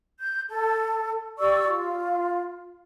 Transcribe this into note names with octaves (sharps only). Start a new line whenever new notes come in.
G6
A4
G4 D5 C#6 E6
F4